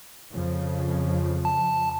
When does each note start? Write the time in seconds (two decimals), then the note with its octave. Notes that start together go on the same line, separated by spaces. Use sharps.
0.31 F2 C#3 F3
1.45 A5